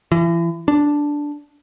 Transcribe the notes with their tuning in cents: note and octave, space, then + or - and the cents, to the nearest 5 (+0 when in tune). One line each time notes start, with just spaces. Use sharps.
E3 +35
D4 -5